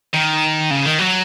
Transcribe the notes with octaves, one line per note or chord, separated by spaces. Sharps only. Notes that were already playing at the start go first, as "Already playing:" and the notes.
D#3
C#3
D#3
F#3